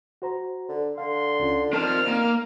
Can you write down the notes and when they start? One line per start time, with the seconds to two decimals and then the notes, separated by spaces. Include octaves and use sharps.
0.22 F#4 C5 A#5
0.69 D3
0.98 D3 F5 C6
1.40 C#2 C#4 F4
1.73 D#3 C4 D5 A5 F6
2.07 A#3